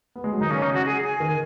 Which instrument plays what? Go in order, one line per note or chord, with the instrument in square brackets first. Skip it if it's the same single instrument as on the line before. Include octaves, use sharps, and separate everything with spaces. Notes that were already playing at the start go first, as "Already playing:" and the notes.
[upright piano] B3
G#3
F#3
[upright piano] D#3 [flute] D#4
[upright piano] C#3 [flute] C#4
[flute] D#4
F#4
G#4
G#5
[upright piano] D#3